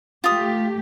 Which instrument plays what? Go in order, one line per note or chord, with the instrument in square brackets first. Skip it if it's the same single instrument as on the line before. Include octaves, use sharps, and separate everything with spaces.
[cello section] A3 G4 [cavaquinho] F4 D#6